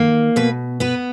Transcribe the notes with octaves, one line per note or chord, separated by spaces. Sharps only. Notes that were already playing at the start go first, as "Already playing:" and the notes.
Already playing: D#3 A#3
B2 B4
B3 B4